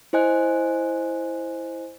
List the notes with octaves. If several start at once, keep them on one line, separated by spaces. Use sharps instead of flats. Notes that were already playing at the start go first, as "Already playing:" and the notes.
E4 C5 D#5 G#5 F#6